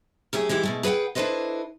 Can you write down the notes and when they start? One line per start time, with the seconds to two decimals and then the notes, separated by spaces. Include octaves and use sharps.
0.33 F#2 A3 G4 G#4
0.49 E3 G#3 E4 G4
0.63 B2 G#3 A3
0.83 G#4 B4 E5 F#5 G5
1.15 D4 E4 A4 B4 C5 D#5